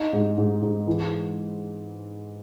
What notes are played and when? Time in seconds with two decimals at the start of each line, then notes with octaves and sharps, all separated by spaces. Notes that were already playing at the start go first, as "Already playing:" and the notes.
Already playing: D#4
0.13 G#2
0.38 G#2
0.62 G#2
0.87 E3